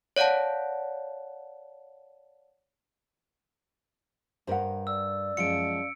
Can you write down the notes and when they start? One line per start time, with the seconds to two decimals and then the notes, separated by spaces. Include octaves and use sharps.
0.16 C#5 D5 F5 F#5 A5
4.47 G2 A#4 C5 F#5
4.87 D5 E6
5.37 F#2 F3 G#3 F5 C#7 D7